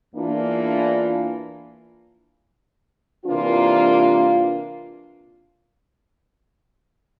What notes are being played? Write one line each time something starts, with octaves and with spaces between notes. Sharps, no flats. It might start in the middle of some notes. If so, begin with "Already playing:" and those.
E2 E3 A#3 D4 F4
C3 E3 A#3 D4 F4